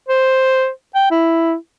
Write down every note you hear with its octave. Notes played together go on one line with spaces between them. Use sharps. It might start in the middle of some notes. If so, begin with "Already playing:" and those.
C5
G5
E4